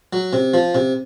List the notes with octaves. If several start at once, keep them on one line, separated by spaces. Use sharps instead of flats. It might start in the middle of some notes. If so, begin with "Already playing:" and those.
F#3
C3
F3
C3